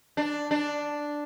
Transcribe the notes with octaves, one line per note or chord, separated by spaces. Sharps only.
D4
D4